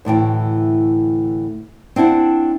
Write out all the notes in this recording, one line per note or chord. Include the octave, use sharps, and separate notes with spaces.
D2 A2 E3 G5
C4 D4 E4 F#5